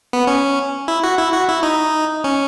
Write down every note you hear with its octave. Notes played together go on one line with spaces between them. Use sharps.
B3
C#4
E4
F#4
E4
F#4
E4
D#4
C#4